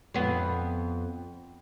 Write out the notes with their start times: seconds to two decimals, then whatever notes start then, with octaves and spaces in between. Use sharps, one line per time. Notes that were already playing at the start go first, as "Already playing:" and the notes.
0.14 F2 B3